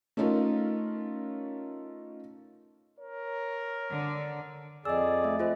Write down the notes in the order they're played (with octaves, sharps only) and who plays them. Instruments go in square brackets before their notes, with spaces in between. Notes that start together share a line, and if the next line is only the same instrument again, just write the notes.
[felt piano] A3 C#4 D#4 F4 A#4
[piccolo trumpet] A#4 [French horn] C#5
[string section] D3
[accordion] F2 G#4 D5 [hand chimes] D#5 E6
[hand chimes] A3 E5
F4 C5 D#5